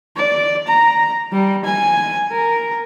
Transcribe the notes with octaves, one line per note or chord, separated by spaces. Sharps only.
D5
A#5
G3
G#5
A#4